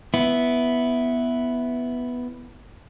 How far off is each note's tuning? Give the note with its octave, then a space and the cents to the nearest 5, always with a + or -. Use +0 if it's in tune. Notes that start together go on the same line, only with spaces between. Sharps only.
B3 +0 E4 +0